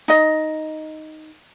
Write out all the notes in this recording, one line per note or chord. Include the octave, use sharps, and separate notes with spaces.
D#4 D#5